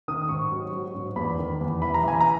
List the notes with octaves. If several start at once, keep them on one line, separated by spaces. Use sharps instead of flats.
D#3 D#6
G#2 C#6
F#3
F#3
G#2
E2 B5
D#3
E2
E3 B5
A#5
E3 G#5
A#5